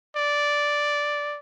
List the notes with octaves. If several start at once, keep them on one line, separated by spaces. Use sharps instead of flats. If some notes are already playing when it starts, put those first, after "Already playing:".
D5